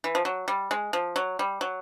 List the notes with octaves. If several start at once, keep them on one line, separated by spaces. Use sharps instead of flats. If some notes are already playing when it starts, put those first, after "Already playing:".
E3
F3
F#3
G3
G#3
F3
F#3
G3
F#3